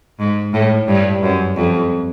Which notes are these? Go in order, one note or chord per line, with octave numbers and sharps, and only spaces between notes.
G#2
A2
G2
F#2
F2